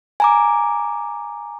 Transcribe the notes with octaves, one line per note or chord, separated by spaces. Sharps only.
G#5 A#5 D6